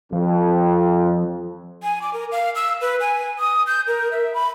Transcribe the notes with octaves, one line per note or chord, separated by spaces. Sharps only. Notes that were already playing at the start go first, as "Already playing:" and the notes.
F2 F3
G#5
D6
A#4
F5
E6
B4
G#5
D#6
G6
A#4
E5
B5